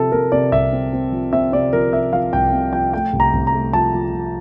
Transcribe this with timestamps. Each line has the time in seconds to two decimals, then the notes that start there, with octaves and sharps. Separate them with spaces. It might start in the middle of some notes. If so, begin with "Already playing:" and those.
Already playing: C3 F3 A4
0.12 C3 A#4
0.32 C3 D5
0.52 C2 E5
0.73 C4
0.93 C4
1.12 F3
1.32 C4 E5
1.52 C3 D5
1.73 F3 A#4
1.93 C3 E5
2.13 F3 F5
2.33 C2 G5
2.53 C3
2.73 F3 G5
2.93 A3 G5
3.13 C2
3.20 A#5
3.33 C2
3.47 A#5
3.54 A3
3.73 F3 A5
3.94 F3
4.13 F3